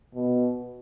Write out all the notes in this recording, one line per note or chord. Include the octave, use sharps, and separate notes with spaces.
B2